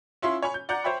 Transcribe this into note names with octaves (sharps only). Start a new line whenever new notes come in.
C#4 E4 F4 E5 C6
C#5 G#5 B5 C#6
G6
D5 F#5 A#5 G6
C5 C#5 E5 G5 B5